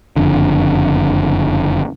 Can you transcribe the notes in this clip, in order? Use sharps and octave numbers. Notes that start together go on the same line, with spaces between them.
F#1 F2 D3